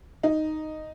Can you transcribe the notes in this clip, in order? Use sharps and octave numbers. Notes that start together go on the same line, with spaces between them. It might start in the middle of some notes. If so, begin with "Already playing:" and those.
D#4